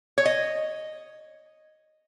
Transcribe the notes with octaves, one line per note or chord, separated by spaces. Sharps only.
C#5
D#5